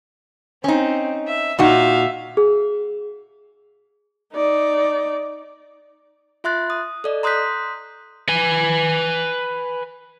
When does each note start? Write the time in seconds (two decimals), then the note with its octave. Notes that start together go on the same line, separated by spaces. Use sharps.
0.64 C4 C#4 D#4
1.28 E5
1.59 A#2 D#4 F#4 E5 F5
2.37 G#4
4.34 D#4 D5
6.44 F4 E5 C6 F#6 A6
6.70 D#6
7.04 A4 D5 D#5
7.23 A#5 C6 D#6 F#6 G6 B6
8.29 B4 G#5